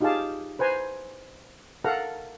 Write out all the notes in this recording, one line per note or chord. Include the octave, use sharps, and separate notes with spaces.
D#4 F4 G4 G#4 F5 A5
B4 C5 G#5 A#5
A4 A#4 F5 F#5 A#5